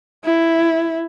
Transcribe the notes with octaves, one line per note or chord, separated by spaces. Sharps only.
E4